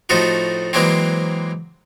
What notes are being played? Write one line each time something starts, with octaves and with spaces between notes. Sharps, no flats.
A2 F3 A3 D#4 F#4
E3 F#3 G#3 A#3 C4